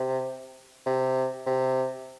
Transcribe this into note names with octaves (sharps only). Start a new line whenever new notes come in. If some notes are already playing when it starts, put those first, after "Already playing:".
Already playing: C3
C3
C3